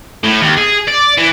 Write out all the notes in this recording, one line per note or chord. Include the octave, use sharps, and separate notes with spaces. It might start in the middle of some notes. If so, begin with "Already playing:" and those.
A2
D#2
G#4
D5
E3